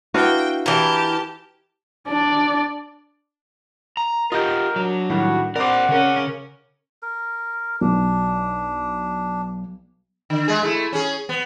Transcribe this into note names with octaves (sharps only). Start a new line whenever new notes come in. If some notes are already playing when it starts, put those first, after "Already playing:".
D4 E4 F#4 B4 F5 G5
E3 G4 A#4 A5
D4 D5
A#5
F4 G4 A#4 D#5 G6
F#3 D4
A2 D#3 G3 F#4
C4 A#4 C5 D5 F#5 C6 D6
C#3 C#4 A#4 C#5
A#4
B1 D4
D3
G#3 G#4
A3 E4
C#4 G#4
B3